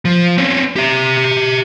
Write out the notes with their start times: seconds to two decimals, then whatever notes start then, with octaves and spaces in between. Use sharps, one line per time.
0.05 F3
0.38 C4 C#4
0.76 G4 E5